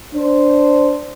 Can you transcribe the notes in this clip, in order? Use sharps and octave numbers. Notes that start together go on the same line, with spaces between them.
D4 C5